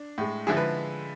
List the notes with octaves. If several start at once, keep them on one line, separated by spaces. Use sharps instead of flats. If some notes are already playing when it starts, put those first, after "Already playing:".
Already playing: D4
A2 G#3
D3 F3 G#3 E4 G#4
B4